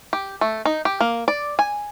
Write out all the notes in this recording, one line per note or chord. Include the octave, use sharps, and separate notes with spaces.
G4
A3
D#4
G4
A#3
D5
G#5